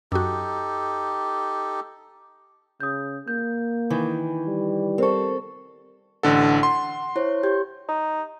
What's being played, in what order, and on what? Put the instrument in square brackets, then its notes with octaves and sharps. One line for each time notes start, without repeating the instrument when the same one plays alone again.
[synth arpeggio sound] F#2 F#4 [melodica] D#4 G4 A4
[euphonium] C#3 [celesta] D#6 G6
[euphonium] A#3 [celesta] G6
[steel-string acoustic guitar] D#3 E3
[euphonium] G3
[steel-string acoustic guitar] C4 A4 [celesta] A#4 C5 C#6
[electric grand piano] A1 D3 A4 [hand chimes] F#5
[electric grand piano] C6
[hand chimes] E4 C5 C#5
G4 G6
[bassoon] D#4